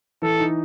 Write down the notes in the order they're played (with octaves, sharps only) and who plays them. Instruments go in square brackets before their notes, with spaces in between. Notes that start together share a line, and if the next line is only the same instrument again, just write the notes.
[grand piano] E3 [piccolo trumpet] A4
[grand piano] D#4